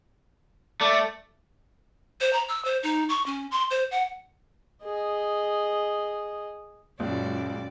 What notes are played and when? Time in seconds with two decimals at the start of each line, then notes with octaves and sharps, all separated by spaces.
0.81 A3 D5
2.21 C5
2.33 A#5
2.49 E6
2.65 C5
2.83 D#4
3.09 C#6
3.26 C#4
3.51 C6
3.71 C5
3.91 F#5
4.84 G#4 D#5
7.00 C#2 F#2 A#2 D5